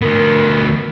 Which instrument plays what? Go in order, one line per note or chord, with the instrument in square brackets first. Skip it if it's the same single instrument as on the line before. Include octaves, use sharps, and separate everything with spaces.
[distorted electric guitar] D2 B3 [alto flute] A#4